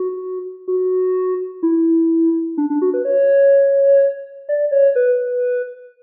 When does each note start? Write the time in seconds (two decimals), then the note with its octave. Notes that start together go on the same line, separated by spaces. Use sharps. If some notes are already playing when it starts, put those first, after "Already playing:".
Already playing: F#4
0.68 F#4
1.63 E4
2.58 D4
2.70 D4
2.82 F#4
2.94 B4
3.05 C#5
4.49 D5
4.71 C#5
4.95 B4